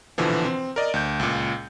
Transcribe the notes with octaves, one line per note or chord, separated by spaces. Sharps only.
A#1 B2 D3 E3 F3
C4
A#4 D5 D#5
D2 G6
C#2 A#2